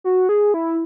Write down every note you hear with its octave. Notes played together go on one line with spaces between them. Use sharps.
F#4
G#4
E4